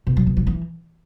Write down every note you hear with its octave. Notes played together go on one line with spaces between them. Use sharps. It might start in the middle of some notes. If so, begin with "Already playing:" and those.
B2
F#3
B2
F#3
E3